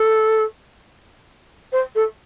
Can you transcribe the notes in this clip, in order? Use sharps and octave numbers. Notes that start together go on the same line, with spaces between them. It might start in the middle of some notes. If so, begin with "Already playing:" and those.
Already playing: A4
C5
A4